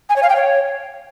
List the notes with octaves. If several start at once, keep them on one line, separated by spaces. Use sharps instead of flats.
G#5
C#5
F5
G5
C#5